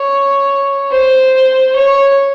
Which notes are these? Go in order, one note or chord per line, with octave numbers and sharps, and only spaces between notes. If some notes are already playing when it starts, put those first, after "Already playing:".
Already playing: C#5
C5
C#5